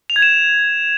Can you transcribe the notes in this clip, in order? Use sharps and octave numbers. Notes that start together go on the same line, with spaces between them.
F7
G#6
E7